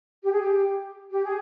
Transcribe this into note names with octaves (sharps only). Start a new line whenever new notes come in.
G4
G#4
G4
G4
G#4